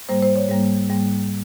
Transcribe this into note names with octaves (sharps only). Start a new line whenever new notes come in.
G#2 G3 A#3 C5
C5
C#5
G#2 G3 A#3
G#2 G3 A#3